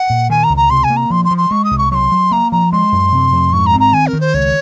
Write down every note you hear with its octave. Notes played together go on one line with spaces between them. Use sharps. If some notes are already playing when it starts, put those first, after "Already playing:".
Already playing: F#5
A#2
D#3 G#5
A#5
C#2
A#5
C3 C6
G#5
A#3
A#5
F3 C6
C6
F3
C6
G#3 C#6
D#6
C2
C#6
F#3 C6 C#6
F#3
A#3 A#5
F3 A#5
G#3 C6
F#2
C3
F2
G#2 C#6
A#5
C4
A#5
D#3 G#5
A#4
D#3
C5
C#2 C#5